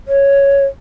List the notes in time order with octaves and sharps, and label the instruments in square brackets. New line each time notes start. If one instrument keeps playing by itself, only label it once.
[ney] C#5